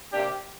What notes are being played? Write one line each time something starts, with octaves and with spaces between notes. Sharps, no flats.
C3 A#3 D4 G4